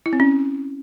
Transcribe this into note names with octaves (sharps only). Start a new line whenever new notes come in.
E4
C4
C#4